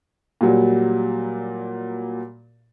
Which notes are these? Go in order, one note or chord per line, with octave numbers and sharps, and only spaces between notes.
A#2 F#3 G3